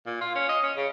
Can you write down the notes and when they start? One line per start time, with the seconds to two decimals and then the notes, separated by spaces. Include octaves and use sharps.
0.07 A#2
0.21 F4
0.35 C#4
0.49 D#5
0.63 C#4
0.76 C#3